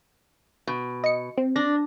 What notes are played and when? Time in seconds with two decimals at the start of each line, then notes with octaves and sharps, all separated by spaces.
0.67 B2
1.04 D#5 C#7
1.38 C4
1.56 D4 A#6